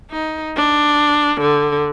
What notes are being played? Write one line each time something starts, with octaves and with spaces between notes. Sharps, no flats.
D#4
D4
D3